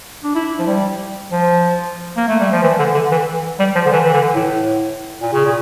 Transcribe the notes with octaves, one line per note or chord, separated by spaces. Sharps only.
D4
E4
F3
G3
F3
A#3
A3
G3
F3
E3
D3
D3
E3
G3
F3
D3
E3
E3
D3
A2
A#2
C#3
A#2